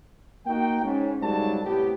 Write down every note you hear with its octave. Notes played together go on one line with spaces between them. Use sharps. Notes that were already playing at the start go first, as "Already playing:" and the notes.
A#3 D#4 F#4 G5
G#2 C#4
G#2 C#3 F#3 G3 A#4 A5
A2 C3 B3 G4